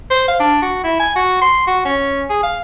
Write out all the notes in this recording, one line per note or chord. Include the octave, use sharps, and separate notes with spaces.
C5
F5
D4
F#4
E4
G#5
F#4
C6
F#4
C#4
G#4
F5